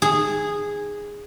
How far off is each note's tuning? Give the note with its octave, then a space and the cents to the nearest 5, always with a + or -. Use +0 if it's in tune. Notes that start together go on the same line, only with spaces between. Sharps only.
G#4 -10